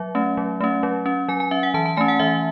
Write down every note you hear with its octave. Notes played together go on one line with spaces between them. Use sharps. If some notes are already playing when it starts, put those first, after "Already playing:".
Already playing: F#3 E5
A3 C#4
F#3
A3 C#4
F#3
C#4
F#3 G#5
G#5
C#4 E5
F#5
E3 A5
A5
A3 C#4 G#5
F#5
E3 E5